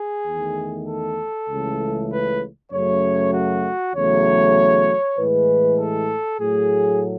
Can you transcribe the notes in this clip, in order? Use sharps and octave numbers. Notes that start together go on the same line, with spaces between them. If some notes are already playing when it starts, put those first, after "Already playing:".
Already playing: G#4
E2 D#3 A3
A4
C#2 C#3 E3 A3
B4
F#2 C#3 F#3 A3 C#5
F#4
E2 C#3 F#3 A3 C#5
A2 E3 G#3 B4
A4
A2 F#3 A3 G#4